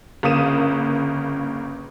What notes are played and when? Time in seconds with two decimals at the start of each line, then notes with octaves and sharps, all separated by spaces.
0.23 G1 C#3 A#3 D#6 D#7 E7